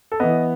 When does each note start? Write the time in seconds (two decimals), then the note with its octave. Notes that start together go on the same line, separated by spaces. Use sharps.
0.12 A4
0.20 E3 B3 D#5